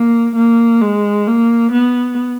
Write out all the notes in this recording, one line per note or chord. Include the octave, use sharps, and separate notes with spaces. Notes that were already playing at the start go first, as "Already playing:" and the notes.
Already playing: A#3
A#3
G#3
A#3
B3